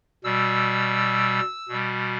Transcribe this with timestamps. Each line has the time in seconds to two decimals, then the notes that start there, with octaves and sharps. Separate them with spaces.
0.24 B2 G3 E6
1.69 B2 G3